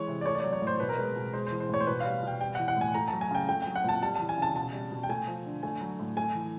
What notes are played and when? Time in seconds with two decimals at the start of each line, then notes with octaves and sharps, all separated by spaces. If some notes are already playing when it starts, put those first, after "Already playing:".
Already playing: E3 G#3 C#5
0.08 C3
0.21 D5
0.26 A3 C#5
0.35 D5
0.40 F#3 C#5
0.53 C#5
0.62 A2
0.67 C5
0.80 B2 B4
0.89 A#4
0.98 G#3 B4
1.16 B2
1.33 G#3 C5
1.47 C5
1.51 E3
1.60 C5
1.69 A2 C#5
1.80 C5
1.87 B2 B4
2.00 G3 F5
2.23 B2 G5
2.41 G3 G5
2.55 E3 F#5
2.68 F#5
2.77 A2 G#5
2.94 A3 A#5
3.08 A5
3.13 F#3
3.21 G#5
3.31 C#3 G5
3.48 A3 G5
3.62 F#3 G5
3.76 F#5
3.84 A#2 A5
4.02 G3 A5
4.16 E3 A5
4.29 G#5
4.38 C#3 A5
4.56 B2 A5
4.73 G3
4.92 B2
5.03 G5
5.09 A3 G#5
5.27 F3
5.46 D3
5.63 A3 G#5
5.81 F#3
5.99 A2
6.17 A3 G#5
6.35 E3